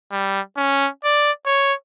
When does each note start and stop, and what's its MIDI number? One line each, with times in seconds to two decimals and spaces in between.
0.12 0.41 55
0.57 0.88 61
1.04 1.31 74
1.46 1.74 73